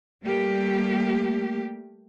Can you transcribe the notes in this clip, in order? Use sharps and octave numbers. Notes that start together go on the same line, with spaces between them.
G3 A3 A#3 G4